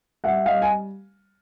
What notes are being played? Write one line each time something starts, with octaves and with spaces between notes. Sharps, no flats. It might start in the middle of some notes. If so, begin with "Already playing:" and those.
G3 E5 F#5
G3 D#5 F5
G#5